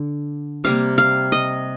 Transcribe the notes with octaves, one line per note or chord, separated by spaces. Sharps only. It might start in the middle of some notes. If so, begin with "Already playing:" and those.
Already playing: D3
C3 G3 A#3 F5
F5
D#5